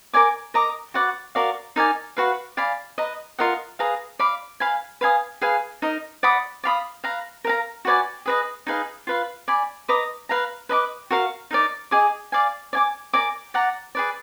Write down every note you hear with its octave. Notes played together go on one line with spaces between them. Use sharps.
A#4 D5 G#5 D6
A#4 D#5 A#5 D6
F#4 B4 D5 F#5
F#4 A#4 D5 F5
D#4 A#4 D5 G#5
F#4 B4 F5
D5 F5 G#5 B5
B4 D#5 A#5
F4 A#4 D#5 F#5
G#4 B4 F5 A#5
D5 F5 B5
B4 F5 G#5 B5
B4 F5 G#5 D#6
G#4 B4 F5 G#5
D#4 A#4 D#5
D5 F#5 B5 D#6
D5 F5 B5 D#6
B4 F5 A#5
A#4 F5 A#5
F#4 B4 D5 G#5
G#4 B4 D#5
D#4 G#4 B4 F5
F4 B4 F5
D5 G#5 B5
B4 D#5 A#5 D6
B4 F5 A#5
B4 D#5 A#5 D6
F#4 A#4 F5
D#4 A#4 D5
G#4 D#5 G#5 D6
D5 F5 G#5
D5 G#5 D6
A#4 D5 G#5 D6
D5 F#5 A#5
G#4 B4 D5